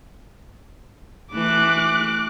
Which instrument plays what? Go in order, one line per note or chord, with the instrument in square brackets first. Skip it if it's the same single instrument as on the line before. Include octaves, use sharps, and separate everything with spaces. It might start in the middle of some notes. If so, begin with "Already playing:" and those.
[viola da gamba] E3 A3 [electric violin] D6 F#6